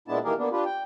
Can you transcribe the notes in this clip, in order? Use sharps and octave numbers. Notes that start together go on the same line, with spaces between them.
A#2 G#3 B3 D4 E4 A5
D#3 E3 A#3 G4 G#4 A#4
A#3 B3 D4
D4 F4 G4 B4
G5